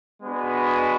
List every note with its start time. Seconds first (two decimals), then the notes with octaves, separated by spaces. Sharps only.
0.21 G#3 B3 D4 F#4 B4